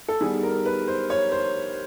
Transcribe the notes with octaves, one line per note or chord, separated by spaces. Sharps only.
A4
D#3 G3 B3 G#4
A#4
B4
C5
C#5
C5